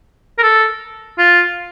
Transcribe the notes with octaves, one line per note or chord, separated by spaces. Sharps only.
A#4
A4
F4